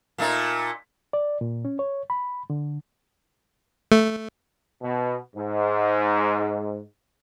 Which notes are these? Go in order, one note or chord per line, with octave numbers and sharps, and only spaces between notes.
A#2 A3 D#4
D5
A#2
C#4
C#5
B5
D3
A3
B2
G#2